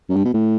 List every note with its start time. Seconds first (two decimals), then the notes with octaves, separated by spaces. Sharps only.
0.09 F#2
0.16 G2
0.25 B2
0.34 A2